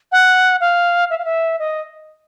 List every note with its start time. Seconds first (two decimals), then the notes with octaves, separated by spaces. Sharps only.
0.12 F#5
0.60 F5
1.10 E5
1.18 F5
1.25 E5
1.59 D#5